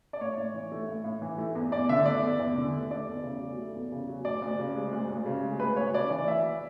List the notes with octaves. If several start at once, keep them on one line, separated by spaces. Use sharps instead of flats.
D5
A2 C#5
A2
E3
A3
A2
A2
E3
A3
E2
E2 D5
D3 E5
A3 D5
E2
E2
D3
A3
A3 D5
E2
C#3
F#3
A3
E2
C#3
F#3
D2 D5
D2
C#3
G#3
D2
D2
C#3
G#3
D2 B4
D2 C#5
C#3 D5
E3 D5
D2 E5